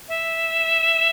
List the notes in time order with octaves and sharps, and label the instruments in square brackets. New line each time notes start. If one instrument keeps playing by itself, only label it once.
[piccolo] E5